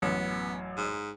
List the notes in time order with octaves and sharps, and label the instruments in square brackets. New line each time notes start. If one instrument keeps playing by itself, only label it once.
[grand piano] A1 F#2 [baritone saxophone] B3
[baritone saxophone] G#2